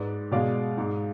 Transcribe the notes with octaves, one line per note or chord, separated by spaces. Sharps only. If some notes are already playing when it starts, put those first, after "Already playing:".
Already playing: G#2 G#3 B4 D5
B2 G#3 D5 F5
G#2 G#3